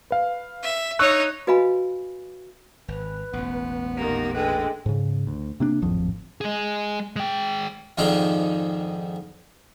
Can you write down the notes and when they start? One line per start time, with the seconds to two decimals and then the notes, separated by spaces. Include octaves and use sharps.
0.11 B4 F5
0.63 E5
0.99 D#4 C#5 C#6 E6 F#6
1.47 F#4 B4 D#5 F5 G#5 B5
2.88 G#1 B4
3.33 E1 A1 B3
3.97 A#2 D#3 A#3 G4
4.34 D3 G#3 B4 G5
4.86 G#2 C#3
5.27 D2
5.60 C3 A#3 D4
5.82 D1 G#1 F2 F3
6.41 G#3 G#4
7.16 G#3 G5
7.98 F2 G#2 D#3 F3 D4 D#4